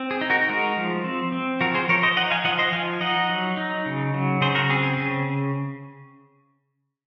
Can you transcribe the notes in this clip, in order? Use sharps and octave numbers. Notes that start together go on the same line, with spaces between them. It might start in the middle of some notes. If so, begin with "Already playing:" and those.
Already playing: C4
G#4
D#4
F#4 A#4
G#3 F#4 A#4
F3
C4
C4
F3 F#4 A#4
G#4 C5
F3 A#4 C#5
C5 D#5
D#4 D#5 F#5
F5 G#5
F3 D#5 F#5
C5 D#5
F3 F5 G#5
D#4 D#5 F#5
F#3
D#4
C#3
F#3
C#3 G#4 C5
F#4 A#4
C4 G#4
G#4
C#3 G#4